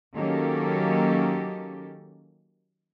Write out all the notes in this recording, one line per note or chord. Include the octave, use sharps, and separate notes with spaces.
D#3 F#3 A#3 C#4 G4 A4